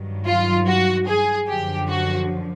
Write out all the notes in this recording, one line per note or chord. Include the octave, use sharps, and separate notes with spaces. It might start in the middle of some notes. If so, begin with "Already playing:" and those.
Already playing: G2 D#3 F#3
F4
F#4
G#4
F#2 D3 F3 G4
F#4